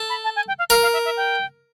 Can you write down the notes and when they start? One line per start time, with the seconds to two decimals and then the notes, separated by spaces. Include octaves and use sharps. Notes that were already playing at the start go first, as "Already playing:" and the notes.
Already playing: A4
0.09 B5
0.24 A5
0.36 G#5
0.48 G5
0.59 F5
0.70 A#4 F5
0.82 F5
0.93 E5
1.05 E5
1.17 G5